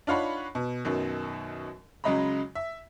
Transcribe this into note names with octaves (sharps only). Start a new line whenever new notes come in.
D4 D#4 F4 C#5 F#5 B5
B2
F#2 B2 D#3 F#3
C#3 F#3 G#3 D#5 A#5 B5
E5